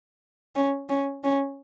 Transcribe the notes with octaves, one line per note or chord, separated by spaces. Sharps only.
C#4
C#4
C#4